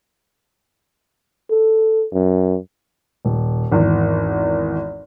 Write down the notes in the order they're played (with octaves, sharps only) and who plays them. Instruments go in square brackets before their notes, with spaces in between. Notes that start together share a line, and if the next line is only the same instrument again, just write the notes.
[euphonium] A4
F#2
[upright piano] D#1
G#1 E2